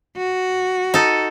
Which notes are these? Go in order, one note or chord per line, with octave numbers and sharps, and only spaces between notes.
F#4
D#4 A4